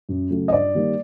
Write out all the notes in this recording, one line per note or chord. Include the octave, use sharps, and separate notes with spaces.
F#2
C#3 F#3 A3
D#5
G2 D5
D#3 G3 A#3